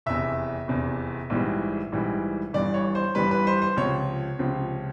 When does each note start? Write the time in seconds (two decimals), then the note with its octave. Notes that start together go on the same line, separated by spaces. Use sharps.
0.06 F1 E2 C3 E5
0.68 F1 E2 C3
1.30 A#1 G#2 E3 G3
1.92 A#1 G#2 E3 G3
2.53 G1 G2 E3 G3 D5
2.74 C#5
2.95 C5
3.15 G1 G2 E3 G3 B4
3.31 B4
3.47 C5
3.62 C5
3.77 C#2 C3 F3 C#5
4.39 C#2 C3 F3